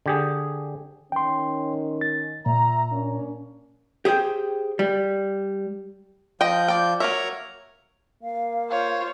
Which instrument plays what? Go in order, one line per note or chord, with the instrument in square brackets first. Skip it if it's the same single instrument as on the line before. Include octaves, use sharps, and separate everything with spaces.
[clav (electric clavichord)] D3 G4 G#4
[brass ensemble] D#3 C#4 [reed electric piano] G5 C6
[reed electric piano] A6
[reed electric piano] A#2 [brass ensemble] E5 A#5
[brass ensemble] A#3 C#4 D4
[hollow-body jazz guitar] G4 G#4 C5 G5
G3
[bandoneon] F3 G6 [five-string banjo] D#5 G5
[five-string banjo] D5 G5
[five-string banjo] F#3 A#3 E5 [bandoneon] A#4 C#5 A#5
[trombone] A#3 [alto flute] F5
[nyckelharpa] F4 C5 [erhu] C#5